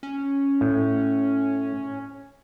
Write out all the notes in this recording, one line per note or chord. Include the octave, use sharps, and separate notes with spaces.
C#4
A2